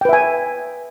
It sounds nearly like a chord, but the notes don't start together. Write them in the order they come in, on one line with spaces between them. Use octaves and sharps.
G5 B4 E5 G#5